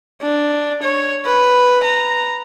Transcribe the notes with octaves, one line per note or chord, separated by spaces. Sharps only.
D4
C#5
B4
A#5